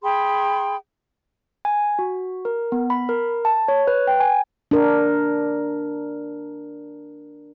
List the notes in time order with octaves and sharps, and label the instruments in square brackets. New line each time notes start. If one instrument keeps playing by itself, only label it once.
[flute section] G#4 G5 B5 C6
[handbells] G#5
F#4
A#4
B3
B5
A#4
A5
C#5
B4
G5
G#5
[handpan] D4 A#4